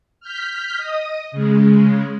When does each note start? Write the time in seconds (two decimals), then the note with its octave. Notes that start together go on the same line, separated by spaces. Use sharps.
0.20 F6 G6 B6
0.77 D#5 D#6
1.32 C#3 G#3